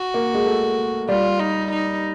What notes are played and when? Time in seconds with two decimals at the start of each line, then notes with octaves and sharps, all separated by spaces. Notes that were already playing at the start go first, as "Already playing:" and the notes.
Already playing: F#4
0.14 A#3
0.34 G#3
0.46 A3
1.09 G3 F4
1.40 D#4
1.71 D#4